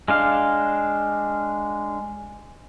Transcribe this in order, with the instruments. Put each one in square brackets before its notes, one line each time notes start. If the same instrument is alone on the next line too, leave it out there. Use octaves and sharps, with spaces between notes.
[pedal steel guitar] G#3 D4 F5